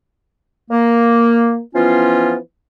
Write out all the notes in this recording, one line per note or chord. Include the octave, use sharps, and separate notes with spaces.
A#3
E3 F3 B3 C#4 F4